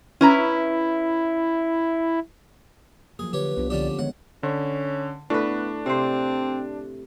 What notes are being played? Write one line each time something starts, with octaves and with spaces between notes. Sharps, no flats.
C#4 E4 B4 A#5
F3 F#3 A#3 G#4
D3 G4 B4 C#5
C2 B3 D4 F4
D3 F3 A#3 C#4 D4 G4 D5
D#3 G#3 B3 C#5 F#5
D3 C#4
A2 B3 D4 B4
C3 C4 C5